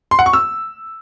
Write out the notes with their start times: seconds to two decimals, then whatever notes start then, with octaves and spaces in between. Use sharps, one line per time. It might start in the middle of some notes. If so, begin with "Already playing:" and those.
0.11 C6
0.19 F#5
0.26 C#6
0.33 E6